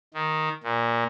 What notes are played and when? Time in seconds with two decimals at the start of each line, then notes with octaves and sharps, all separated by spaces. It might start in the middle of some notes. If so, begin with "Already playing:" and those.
0.14 D#3
0.63 A#2